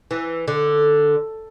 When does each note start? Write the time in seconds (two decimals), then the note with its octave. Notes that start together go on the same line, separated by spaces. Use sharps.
0.11 E3
0.48 D3